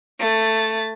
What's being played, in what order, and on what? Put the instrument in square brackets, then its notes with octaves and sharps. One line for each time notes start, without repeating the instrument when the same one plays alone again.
[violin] A3 A6